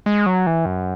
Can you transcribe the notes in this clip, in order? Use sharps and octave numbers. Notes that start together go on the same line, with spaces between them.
G#3
F#3
E3
F#2